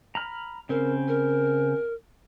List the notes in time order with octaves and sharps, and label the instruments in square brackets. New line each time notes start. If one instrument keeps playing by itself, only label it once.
[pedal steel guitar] A#5 B5 F6
[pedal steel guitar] C#3 C4 [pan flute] A#4
[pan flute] A#4